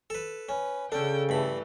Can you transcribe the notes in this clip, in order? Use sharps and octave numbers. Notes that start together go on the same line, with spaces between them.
A4 B4
C#4 B4
C#3 C#4 D4 A4 G5
G2 E3 A3 B5